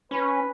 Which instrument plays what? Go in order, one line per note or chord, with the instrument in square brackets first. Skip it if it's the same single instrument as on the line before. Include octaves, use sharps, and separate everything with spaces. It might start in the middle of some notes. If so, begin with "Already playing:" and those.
[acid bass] C#4 [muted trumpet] B4